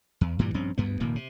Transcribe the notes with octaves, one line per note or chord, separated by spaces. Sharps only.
E2
G2 A#2 E3 G3
A#1 G2 C4 C#4
D2 G2 B3
F1 A#2 D#3 A#3
C3